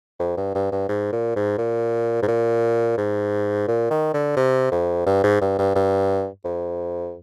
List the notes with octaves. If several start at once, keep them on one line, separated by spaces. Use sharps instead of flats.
F2
G2
G2
G2
G#2
A#2
G#2
A#2
G#2
A#2
G#2
A#2
D#3
D3
C3
F2
G2
G#2
G2
G2
G2
F2